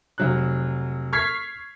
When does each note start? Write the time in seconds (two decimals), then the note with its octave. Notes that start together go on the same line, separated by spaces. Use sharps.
0.18 F1 F#3 F#6
1.13 C#6 F6 G#6 B6 C7